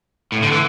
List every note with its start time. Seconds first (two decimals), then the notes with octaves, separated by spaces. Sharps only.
0.32 A2
0.43 D3
0.52 E3